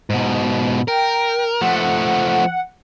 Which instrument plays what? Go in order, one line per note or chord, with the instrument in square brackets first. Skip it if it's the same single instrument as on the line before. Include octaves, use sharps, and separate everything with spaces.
[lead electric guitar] G#2 B2
[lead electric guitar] A#4 [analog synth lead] G5
[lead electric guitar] F3 A3 [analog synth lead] F#5